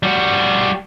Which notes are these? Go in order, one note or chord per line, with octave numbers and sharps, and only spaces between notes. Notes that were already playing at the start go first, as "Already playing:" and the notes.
G3 F#4